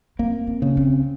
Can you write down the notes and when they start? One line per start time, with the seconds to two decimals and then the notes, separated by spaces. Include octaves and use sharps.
0.19 A#3 C4
0.47 C4
0.62 C#3
0.77 C4